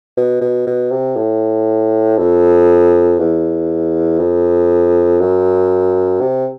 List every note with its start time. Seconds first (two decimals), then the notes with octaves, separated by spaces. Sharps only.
0.17 B2
0.41 B2
0.67 B2
0.91 C3
1.17 A2
2.18 F2
3.19 E2
4.19 F2
5.20 F#2
6.21 C3